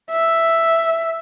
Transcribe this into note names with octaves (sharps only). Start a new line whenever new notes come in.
E5